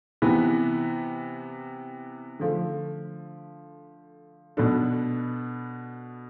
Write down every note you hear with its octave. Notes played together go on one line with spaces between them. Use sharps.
C3 E3 B3
D3 F3 A3
B2 B3 D4 A4